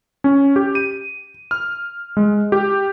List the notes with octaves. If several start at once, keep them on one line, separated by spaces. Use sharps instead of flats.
C#4
G4
D#7
F6
G#3
G4